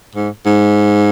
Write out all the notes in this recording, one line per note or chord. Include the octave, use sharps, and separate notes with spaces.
G#2
G#2